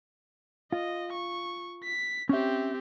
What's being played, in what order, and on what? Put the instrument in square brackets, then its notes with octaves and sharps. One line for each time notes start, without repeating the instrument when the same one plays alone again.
[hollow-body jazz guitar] F4 [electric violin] D#5
[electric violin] C#6
B6
[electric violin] C4 G4 [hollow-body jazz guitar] C#4 E5